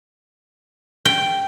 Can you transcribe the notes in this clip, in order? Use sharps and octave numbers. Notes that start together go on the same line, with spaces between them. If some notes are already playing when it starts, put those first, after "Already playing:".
G5